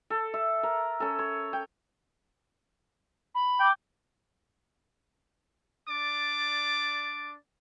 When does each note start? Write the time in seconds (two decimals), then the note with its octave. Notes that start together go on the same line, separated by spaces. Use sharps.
0.10 A4
0.34 E5
0.63 A#4
1.00 C#4 A4
1.19 C#5
1.53 G5
3.35 B5
3.60 G5 D6
5.89 D4 D5 D6